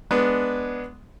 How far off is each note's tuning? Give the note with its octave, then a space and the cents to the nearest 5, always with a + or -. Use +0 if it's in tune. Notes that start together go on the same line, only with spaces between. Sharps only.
G#3 +0 B3 +0 D4 +0